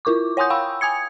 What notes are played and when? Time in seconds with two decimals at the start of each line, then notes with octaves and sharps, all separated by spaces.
0.05 E4 F4 A#4 C#6 D6
0.37 C#5 F#5 G#5 C6 D#6 G6
0.50 F5 G5 B5 C#6 E6
0.81 G#5 D#6 G#6 C#7